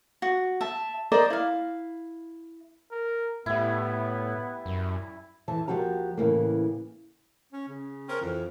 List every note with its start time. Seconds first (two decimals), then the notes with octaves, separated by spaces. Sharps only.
0.22 F#4
0.61 E5 A5
1.12 A#4 C5 D5 D#5
1.30 E4 F5
2.92 A#4
3.46 A2 G3 B3 E4
4.65 F#2
5.48 F2 E3 A5
5.68 D#2 E3 F3 F#4 G4 A#5
6.17 A2 C#3 E3 A#3
7.52 C#4
7.68 C#3
8.09 C4 C#4 A#4
8.21 F2 E3